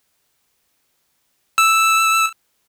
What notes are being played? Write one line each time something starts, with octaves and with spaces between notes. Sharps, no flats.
E6